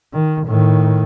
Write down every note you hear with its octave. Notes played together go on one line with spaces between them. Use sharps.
D#3
A2 D#3